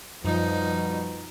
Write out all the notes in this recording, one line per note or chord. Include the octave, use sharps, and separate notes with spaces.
F#2 B2 F3 G3 D#4